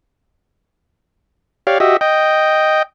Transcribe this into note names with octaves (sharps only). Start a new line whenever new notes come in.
G4 C#5 D5 F5
F#4 G4 D#5 E5
D#5 G5